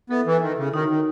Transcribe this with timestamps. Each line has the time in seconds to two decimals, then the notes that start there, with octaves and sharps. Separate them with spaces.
0.10 B3 E4 A4 E5
0.26 E3
0.41 D#3
0.58 C#3
0.73 D#3 D#4 F#4 C#5
0.89 D#3